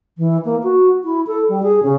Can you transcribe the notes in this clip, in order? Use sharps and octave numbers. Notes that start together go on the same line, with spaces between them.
E3
A#3
F#4
E4
A4
G3
G#4
C#3